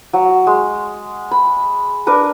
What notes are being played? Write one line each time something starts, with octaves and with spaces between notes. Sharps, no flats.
F#3
G#3
B5
D4 A#4 B4 A#5